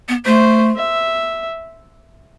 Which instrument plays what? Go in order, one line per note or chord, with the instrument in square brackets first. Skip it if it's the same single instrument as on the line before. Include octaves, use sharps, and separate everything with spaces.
[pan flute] B3
[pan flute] A3 [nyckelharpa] C5
[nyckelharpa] E5